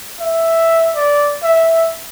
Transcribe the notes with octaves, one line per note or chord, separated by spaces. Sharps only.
E5
D5
E5